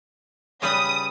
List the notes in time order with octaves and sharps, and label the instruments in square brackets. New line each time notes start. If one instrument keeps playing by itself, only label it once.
[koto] C#3 G3 B4 [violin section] D#6